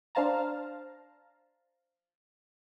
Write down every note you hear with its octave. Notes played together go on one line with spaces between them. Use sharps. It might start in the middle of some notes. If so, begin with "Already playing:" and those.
D4 C5 F5 A5 A#5